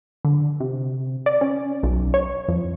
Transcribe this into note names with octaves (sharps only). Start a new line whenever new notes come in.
D3
C3
D5
C#4
B1
C#5
F2